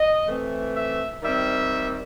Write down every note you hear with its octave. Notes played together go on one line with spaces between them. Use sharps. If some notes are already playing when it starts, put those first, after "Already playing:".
Already playing: D#5
E3 A3 C4
E5
D#3 G3 C4 E5